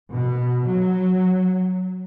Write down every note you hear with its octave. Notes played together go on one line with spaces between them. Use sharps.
B2
F#3